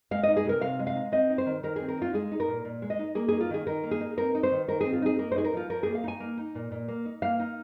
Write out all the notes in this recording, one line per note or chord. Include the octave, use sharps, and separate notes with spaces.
G#3 F5
D#5
D#4
G#4
C3 A#4
C3 F5
G#3
F5
D#4
C4 D#5
D#4
C5
D#3
D#3 A#4
G#4
C4
A#4
D#4 F4
G#3 G#4
D#4
A#4
A#2
A#2
G#3
D#5
D#4
A#3 G#4
G#4
D#4
F4
D#3 G#4
D#3 A#4
A#3
G#4
D#4
C4 A#4
D#4
C5
D#3
D#3 A#4
G#4
C4
F4
D#4 G#4
A#3 A#4
C5
D#4 G#4
A#4
F3 F4
F3 A#4
A#3 G#4
F5
D#4 G#5
A#3
D#4
A#2
A#2
A#3
D#4
A#3 F5
D#4